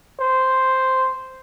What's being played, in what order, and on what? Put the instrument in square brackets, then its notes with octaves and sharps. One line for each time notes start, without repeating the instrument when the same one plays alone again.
[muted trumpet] C5